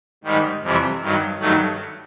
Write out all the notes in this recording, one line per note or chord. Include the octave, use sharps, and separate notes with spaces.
G#2 D#3 G3
F2 C3 E3 G3
G2 D#3 F#3
G2 D#3 F#3 A3